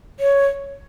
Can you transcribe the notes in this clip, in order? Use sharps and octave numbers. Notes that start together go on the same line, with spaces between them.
C#5